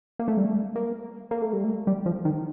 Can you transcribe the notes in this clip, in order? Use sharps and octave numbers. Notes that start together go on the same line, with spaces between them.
A#3
A3
G3
A3
A#3
A#3
A3
G3
A3
G3
F3
D#3